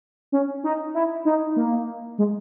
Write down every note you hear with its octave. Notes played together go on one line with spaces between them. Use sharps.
C#4
D#4
E4
D#4
A#3
G#3